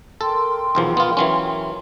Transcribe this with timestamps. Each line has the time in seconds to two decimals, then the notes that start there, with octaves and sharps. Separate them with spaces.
0.21 A4 A#4 G5 C6
0.75 B1 E2 F3
0.97 B3 F4
1.17 E3 F#3 C#4